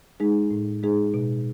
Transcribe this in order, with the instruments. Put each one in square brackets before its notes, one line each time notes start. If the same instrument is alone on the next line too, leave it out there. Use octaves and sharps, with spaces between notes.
[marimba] G#3 D#4 G#4
A2
G#3 D#4 G#4
B2